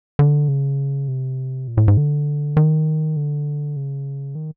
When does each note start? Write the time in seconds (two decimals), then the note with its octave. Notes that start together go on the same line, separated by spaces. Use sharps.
0.19 D3
0.48 C#3
1.08 C3
1.68 A#2
1.77 A2
1.88 G#2
1.97 D3
2.57 D#3
3.17 D3
3.76 C#3
4.35 D#3